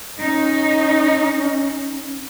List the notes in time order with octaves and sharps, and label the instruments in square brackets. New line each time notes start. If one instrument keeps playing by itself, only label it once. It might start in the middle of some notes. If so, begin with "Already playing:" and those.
[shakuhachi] C#4 [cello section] D#4